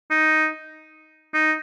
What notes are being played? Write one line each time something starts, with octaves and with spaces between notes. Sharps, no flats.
D#4
D#4